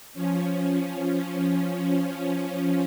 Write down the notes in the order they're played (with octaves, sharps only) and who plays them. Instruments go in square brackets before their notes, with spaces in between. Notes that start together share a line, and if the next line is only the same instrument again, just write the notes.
[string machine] F3 C#4